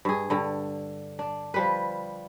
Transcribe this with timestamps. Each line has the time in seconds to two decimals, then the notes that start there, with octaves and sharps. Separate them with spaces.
0.05 G2 G#4
0.30 G2 D3
1.19 D4
1.54 F3 G3 B4